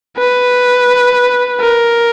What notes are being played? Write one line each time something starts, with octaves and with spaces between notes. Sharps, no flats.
B4
A#4